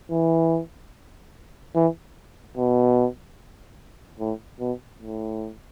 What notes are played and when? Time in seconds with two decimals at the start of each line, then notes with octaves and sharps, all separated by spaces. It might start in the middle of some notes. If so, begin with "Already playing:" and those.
0.11 E3
1.75 E3
2.57 B2
4.20 A2
4.60 B2
5.02 A2